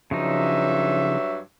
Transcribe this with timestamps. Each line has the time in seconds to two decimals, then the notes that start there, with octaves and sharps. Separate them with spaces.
0.11 G2 C#3 F3 F#3 D#4 E5